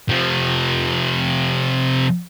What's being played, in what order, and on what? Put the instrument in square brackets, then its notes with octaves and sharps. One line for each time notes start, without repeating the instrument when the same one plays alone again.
[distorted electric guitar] C3 F3